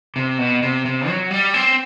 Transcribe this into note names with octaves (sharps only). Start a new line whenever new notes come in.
C3
B2
C3
C3
F#3
G3
C4